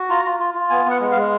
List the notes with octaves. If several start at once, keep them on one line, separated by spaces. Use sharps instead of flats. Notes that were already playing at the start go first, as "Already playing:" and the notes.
Already playing: F#4
F4 A#5
F4
F4
F4
B3 G#5
B3 F#5
G#3
F5
G#3